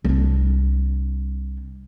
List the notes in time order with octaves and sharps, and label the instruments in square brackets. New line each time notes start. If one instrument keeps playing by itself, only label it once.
[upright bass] C2 D4